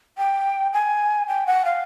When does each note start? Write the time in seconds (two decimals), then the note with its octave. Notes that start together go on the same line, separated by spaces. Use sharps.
0.18 G5
0.73 G#5
1.28 G5
1.47 F#5
1.65 F5